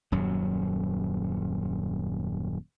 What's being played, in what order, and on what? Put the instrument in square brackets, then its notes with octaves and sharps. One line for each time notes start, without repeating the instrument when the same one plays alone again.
[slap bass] D#1 F#2 F#3